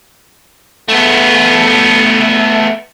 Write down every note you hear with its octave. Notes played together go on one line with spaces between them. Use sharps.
A3 B3